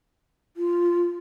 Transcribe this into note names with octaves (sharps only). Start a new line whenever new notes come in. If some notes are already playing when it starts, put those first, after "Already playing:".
F4